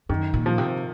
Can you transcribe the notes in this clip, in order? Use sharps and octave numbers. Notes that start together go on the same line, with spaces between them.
F#2 D#3
A#2
F3
C3